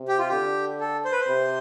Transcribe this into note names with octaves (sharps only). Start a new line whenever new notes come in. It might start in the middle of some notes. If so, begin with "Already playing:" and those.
Already playing: C3
G4
F4
D3 G4
A4
C5
B4
C5
C3